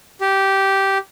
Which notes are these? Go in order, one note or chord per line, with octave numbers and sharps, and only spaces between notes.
G4